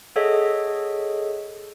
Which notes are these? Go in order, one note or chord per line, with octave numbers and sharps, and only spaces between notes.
G#4 A4 C#5 D#5 E5 F#5